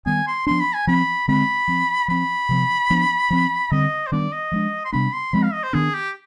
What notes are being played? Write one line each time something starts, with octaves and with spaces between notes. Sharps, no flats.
D#3 G3 B3 G#5
C6
F3 B3 D4 C6
B5
G#5
F3 C4 B5
D3 G#3 C4 B5
F3 C4
F3 C4 B5
C3 F3 B3
F3 B3 D4
F3 C4
D3 G3 C4 D#5
C5
D#3 G3 B3 D4 D5
D#5
F3 G#3 D4
C6
C3 G3 B3 D4 B5
C6
F3 G#3 C4 B5
F5
D#5
C5
D#3 B3 D4 G#4
G4